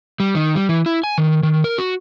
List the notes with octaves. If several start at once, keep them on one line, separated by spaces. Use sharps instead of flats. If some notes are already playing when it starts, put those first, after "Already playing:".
G3
D#3
G3
E3
E4
G#5
D#3
D#3
A#4
F#4